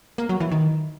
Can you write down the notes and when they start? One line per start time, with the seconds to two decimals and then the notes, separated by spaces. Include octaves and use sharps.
0.18 A#3
0.29 F#3
0.40 E3
0.51 D#3